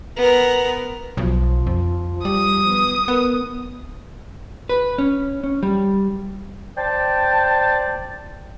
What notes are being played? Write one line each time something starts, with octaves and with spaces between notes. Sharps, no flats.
B3 A#4
B1 F3
F2
G3 D#6
B3
B3 A#4
B4
C#4
C#4
G3
C5 D5 G5 A5